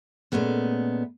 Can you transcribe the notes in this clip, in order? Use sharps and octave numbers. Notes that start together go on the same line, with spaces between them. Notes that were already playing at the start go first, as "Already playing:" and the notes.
A#2 G#3 A3 B3 C#4